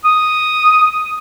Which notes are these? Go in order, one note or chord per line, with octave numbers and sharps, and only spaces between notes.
D#6